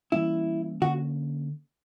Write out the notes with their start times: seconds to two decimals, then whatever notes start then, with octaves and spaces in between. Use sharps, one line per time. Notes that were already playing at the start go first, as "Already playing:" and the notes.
0.12 E3 G3 A#3 C#4 E4
0.82 D3 A#3 C#4 F#4